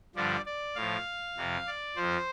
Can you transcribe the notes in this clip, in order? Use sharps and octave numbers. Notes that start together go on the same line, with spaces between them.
G2 D3 F3 D5
D5
A2 F3 F5
F2 C3 F3
D5
F2 F3 C5